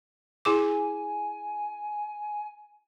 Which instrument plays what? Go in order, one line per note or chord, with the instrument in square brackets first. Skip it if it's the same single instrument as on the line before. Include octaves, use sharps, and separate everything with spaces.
[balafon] E4 G#4 D6 [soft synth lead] G#5